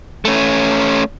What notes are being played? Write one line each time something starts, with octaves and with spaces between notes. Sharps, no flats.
A3 C#4